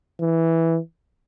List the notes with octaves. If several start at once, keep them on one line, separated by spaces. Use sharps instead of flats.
E3